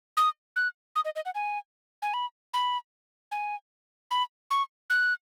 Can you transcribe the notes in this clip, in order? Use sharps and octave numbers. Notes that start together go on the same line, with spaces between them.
D#6
F#6
D#6
D#5
D#5
F#5
G#5
G#5
B5
B5
G#5
B5
C#6
F#6